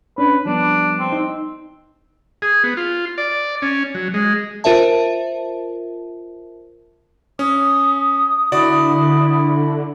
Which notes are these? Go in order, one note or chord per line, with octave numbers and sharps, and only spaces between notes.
C#4 D4 B4
F3 G3 B3 D4
C4
D#4
G#4
B3
F4
D5
C#4
F#3
G#3
F4 A#4 C5 E5 A5
C#4 D#6
D3 E4 F#4 D5